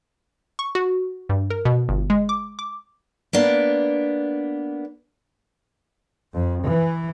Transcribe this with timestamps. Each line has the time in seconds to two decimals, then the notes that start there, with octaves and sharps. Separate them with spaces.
0.59 C#6
0.75 F#4
1.29 G2
1.50 A#4
1.65 B2
1.89 G1
2.10 G#3
2.29 D6
2.59 D6
3.33 A#3 B3 D4
6.34 F2
6.65 E3